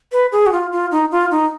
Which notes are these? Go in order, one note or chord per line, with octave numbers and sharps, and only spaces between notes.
B4
G#4
F#4
F4
F4
D#4
F4
D#4